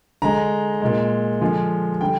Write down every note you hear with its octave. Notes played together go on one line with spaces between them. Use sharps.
D3 G#3 A#5
A#2 G#3
D3 F3 G#3
D3 G3 G5